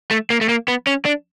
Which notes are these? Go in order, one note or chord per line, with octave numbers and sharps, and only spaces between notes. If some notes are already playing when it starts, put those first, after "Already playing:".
A3
A#3
A3
A#3
B3
C#4
D4